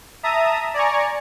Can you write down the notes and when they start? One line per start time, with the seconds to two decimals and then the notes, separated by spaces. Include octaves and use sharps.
0.23 E5 A5 A#5 D#6
0.74 D5 G#5 A#5 C#6